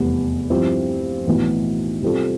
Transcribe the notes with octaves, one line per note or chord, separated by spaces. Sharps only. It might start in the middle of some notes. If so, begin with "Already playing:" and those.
Already playing: F1 E2 C3 G3 B3
G2 F3 C4 E4 G4
B1 A2 E3 B3
C3 G3 C4 F4 A4